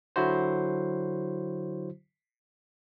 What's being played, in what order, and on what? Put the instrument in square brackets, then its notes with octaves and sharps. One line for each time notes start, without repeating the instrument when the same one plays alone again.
[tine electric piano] D3 F#3 E4 F#4 C5